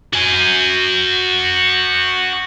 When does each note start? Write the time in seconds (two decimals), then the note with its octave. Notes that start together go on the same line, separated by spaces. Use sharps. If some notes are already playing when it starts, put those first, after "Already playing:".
0.13 F#4 G#5